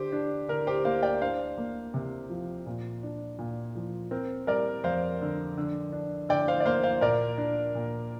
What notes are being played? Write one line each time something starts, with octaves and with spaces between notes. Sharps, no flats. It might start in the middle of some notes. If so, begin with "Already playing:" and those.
Already playing: D3 G4 C5
D4
D3 A#4
G4 C5
A#3 C5 F5
D5 G5
D4 C5 F5
A#3
C3
F3
A#2
D4
A#2
F3
C4 A#4
G3 A#4 D5
F2 C5 F5
D3
D3
D4
D3 D5 G5
C5 F5
D5
A#3 C5 F5
C5 F5
A#2 A#4 D5
D4
A#2